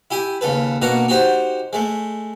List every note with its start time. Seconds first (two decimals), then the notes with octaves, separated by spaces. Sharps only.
0.11 E4 G4 G#5
0.41 D#2 C#3 A4 B4
0.82 B2 A#3 D4 F#4 A#5
1.08 D#4 F#4 G4 C5
1.73 G#3 A3